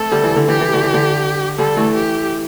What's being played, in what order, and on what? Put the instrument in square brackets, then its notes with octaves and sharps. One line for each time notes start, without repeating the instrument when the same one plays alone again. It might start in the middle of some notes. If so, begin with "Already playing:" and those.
Already playing: [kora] A3 C4 [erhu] A4
[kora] D3 G3
E3
D3
[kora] E3 [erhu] G4
[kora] E3
D3
E3
D3
[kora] D3 G3 [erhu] A4
[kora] E3 A3
[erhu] G4